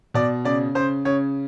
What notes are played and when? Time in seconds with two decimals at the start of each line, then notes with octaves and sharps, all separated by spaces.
0.14 B2 D5
0.45 C#3 D5
0.75 C#3 C5
1.05 C#3 C#5